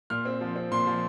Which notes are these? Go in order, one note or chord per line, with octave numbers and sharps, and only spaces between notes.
A#2 F6
C4
F3
C4
A#2 C6
F3